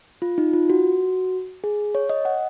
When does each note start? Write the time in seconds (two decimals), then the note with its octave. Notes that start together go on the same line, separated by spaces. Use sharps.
0.22 F4
0.38 D#4
0.54 F4
0.70 F#4
1.64 G#4
1.95 C#5
2.10 D#5
2.25 F#5